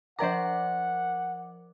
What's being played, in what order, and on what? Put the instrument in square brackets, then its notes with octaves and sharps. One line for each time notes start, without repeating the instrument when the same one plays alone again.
[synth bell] F3 A#4 D6 [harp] C5 D5 A#5 [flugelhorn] F#5